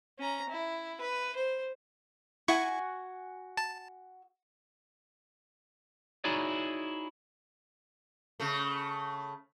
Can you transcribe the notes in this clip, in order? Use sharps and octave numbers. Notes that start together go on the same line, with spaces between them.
C#4 A#5
E4
B4
C5
E4 F#4 G#5 C#6
A5
D#4 E4 F#4 G#4 C#5 D5
C#3 A3